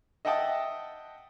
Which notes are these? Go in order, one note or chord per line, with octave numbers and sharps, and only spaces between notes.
D#5 E5 F#5 G5 A5 D#6